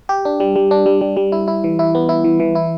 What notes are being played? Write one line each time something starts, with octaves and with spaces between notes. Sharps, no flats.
G4
D4
G3
G3
D4
G3
G3
G3
E4
E4
E3
E4
B3
E4
E3
E3
E4